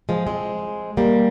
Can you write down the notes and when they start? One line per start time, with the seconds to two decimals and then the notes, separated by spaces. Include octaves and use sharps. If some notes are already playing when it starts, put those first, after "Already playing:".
0.09 F3 G#3
0.27 G#3 C4
0.97 G3 A#3